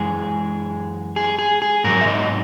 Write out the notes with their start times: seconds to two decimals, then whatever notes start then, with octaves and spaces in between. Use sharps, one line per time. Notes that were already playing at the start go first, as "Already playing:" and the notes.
Already playing: F#2 E3 G#3 G#4
1.16 G#4
1.39 G#4
1.62 G#4
1.84 G#2 F#3 A#4
2.01 E5
2.07 D#5